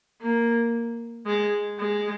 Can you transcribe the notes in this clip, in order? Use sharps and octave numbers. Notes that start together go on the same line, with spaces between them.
A#3
G#3
G#3